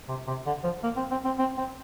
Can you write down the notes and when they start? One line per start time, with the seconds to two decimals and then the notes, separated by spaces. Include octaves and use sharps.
0.09 C3
0.27 C3
0.46 D3
0.64 F3
0.83 A#3
0.97 C4
1.11 C4
1.25 C4
1.39 C4
1.57 C4